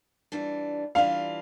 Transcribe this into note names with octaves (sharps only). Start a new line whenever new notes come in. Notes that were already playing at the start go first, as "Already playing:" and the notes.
E3 G3 D4 F4
E3 G3 D4 F4 F5